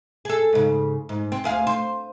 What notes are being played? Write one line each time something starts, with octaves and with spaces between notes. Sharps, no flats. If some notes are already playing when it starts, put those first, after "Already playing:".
G#4 A4
G#2 C#3
G#2
C4
D2 G#4 F5
C5